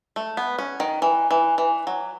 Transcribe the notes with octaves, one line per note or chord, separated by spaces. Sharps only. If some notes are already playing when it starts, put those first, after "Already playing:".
A3
B3
C#4
D#3
E3
E3
E3
F#3